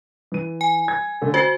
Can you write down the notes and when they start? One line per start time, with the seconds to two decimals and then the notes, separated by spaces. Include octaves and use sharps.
0.32 E3 D#7
0.61 G#5
0.88 G#6
1.21 D3 A3 C#4
1.34 F#4 C5 A6 C7